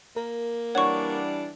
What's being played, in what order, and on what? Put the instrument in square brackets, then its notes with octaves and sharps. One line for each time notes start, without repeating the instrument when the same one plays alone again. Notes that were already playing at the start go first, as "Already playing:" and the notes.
[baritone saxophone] A#3 [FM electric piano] A#4
[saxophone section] E3 G3 D4 [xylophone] C#5 C#6 [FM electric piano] F#5